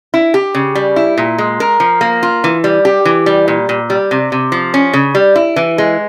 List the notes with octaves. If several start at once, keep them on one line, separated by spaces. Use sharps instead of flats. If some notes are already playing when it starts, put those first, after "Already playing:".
E4
G4
C#3
G3
E4
A#2
G#3
A#4
F3
A#3
F4
E3
G3
G4
E3
G3
A#2
A#2
G3
C3
C3
F3
C#4
C#3
G3
E4
E3
G#3